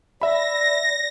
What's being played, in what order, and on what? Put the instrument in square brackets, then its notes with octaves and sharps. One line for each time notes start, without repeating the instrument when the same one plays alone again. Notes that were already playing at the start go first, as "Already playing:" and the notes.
[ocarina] D5 [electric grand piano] E5 B5 [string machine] A#6